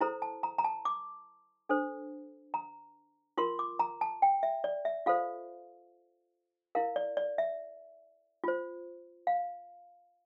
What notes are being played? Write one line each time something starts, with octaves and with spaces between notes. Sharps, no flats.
E4 A4 C5 A#5
A5
A#5
A#5
A5
D6
D4 A4 C5
A#5
F4 A#4 C6
D6
A#5
A5
G5
E5
D5
E5
F4 A4 C5 F5
E4 A#4 F5
D5
D5
E5
F4 C5
F5